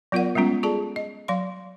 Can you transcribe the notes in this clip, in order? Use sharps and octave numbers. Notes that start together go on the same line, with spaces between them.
F#3 B3 F4 A#4 D5 F#5
G3 G#3 B3 C#4 F4
F4 G#4 A4 D5 A5
D#5
F#3 F5 C6